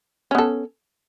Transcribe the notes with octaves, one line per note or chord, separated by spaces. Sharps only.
B3 C#4 A4